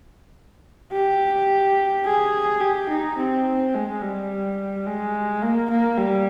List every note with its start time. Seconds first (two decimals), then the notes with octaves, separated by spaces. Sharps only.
0.93 G4
2.05 G#4
2.61 G4
2.90 D#4
3.18 C4
3.74 G#3
4.02 G3
4.86 G#3
5.42 A#3
5.70 A#3
5.98 G3